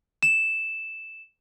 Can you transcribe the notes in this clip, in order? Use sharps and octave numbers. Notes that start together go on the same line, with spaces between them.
E7